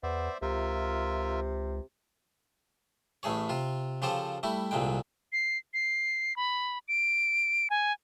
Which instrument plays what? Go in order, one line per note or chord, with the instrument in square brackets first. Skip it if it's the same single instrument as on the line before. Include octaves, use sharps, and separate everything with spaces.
[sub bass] E2 [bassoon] B3 [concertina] C5 D5 E5
[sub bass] C#2 [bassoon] C3 [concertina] F4 A#4 E5
[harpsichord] A1 A2 A3 G#4 C#5
C3 F4
C#3 F3 F4 G4 A4 C5
G3 A3 E4
C2 A#2 D3 G#3 G5
[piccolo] C7
C7
B5
D7
G#5